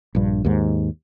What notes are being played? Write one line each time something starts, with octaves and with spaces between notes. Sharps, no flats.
A#1 G2
D#2 G#2